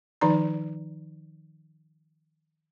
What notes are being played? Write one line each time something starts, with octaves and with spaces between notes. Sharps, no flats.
D#3 F3 D#4 D5 A#5